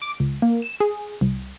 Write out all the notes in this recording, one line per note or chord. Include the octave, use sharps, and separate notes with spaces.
D6
C#2
A#3
E7
G#4
C2